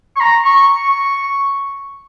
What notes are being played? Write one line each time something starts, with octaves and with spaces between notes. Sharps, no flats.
C#6
A#5
C#6
C#6